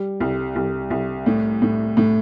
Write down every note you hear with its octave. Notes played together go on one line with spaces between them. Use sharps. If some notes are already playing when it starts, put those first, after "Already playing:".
Already playing: G3
C2
C2
C2
A2
A2
A2